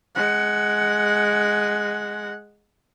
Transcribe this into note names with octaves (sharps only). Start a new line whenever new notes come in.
G#3 F#5